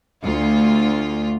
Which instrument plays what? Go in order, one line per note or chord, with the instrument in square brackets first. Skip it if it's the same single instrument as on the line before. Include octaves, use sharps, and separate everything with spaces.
[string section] D2 F4